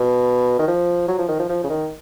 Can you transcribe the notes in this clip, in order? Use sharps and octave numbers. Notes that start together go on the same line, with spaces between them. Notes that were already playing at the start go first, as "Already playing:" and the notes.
Already playing: B2
D#3
F3
F#3
F3
D#3
F3
F3
C#3
D#3